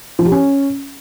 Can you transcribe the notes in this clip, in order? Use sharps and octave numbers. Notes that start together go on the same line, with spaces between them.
F3
G4
C#4